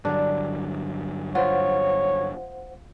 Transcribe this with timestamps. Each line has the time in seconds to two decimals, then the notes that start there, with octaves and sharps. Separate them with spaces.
0.05 G2 D3 F#3 D4
1.35 F4 C5 C#5 F#5